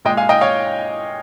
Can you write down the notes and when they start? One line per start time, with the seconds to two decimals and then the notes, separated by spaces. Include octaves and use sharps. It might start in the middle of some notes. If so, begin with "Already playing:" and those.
0.05 A#2 G#3 D#5 G5
0.17 F5 G#5
0.29 D#5 G5
0.41 C#5 F5